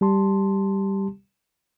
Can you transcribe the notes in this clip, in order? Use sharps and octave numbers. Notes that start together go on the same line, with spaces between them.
G3 G4 A5 C6